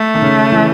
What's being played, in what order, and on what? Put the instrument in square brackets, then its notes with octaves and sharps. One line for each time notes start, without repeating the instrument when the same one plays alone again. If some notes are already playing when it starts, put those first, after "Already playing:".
Already playing: [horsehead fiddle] A3
[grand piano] D#3
C#3
E3